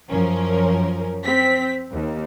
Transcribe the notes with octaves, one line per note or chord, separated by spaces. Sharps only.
F#2 F3 C#4 A#4
C4 B6
D#2